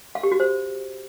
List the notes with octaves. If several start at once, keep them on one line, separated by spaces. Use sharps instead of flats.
F5
G4
F#4
C5